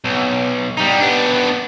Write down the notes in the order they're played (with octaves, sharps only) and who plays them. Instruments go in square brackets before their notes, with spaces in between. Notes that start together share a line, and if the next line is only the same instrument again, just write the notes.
[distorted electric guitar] B1
G3 D#4
B3 D4